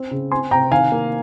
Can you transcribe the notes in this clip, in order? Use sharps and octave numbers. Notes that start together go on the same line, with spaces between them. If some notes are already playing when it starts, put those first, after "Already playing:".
Already playing: C4
C#3
C4 G#5 C6
C3 G5 A#5
D#3 F5 G#5
A#3